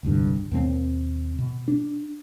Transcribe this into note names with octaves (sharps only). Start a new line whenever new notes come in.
E1 C2 G2 D3
D#2 B2 G3 C4
B2
D4